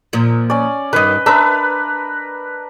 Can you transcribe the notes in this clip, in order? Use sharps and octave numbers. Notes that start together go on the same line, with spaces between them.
A#2 F3
C#4 D5
G2 D#3 B4 D#5
D4 A#4 B4 E5